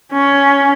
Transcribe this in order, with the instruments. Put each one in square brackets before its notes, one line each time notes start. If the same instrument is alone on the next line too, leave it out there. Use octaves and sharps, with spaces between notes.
[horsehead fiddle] C#4